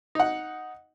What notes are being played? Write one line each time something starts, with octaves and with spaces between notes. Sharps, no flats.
D#4 F#5